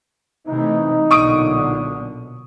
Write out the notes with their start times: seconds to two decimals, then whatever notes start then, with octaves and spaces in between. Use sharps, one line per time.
0.47 C3 E3 A3 D#4
1.11 B1 A#2 D3 C#6 D#6 D7